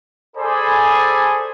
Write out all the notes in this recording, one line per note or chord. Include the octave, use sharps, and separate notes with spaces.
G#4 A4 C5 D5 G#5 B5